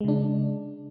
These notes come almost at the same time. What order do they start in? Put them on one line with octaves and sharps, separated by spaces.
G#3 C#3 D4